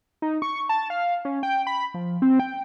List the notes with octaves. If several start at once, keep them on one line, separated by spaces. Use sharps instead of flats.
D#4
C#6
A5
F5
C#4
G5
B5
F3
C4
G5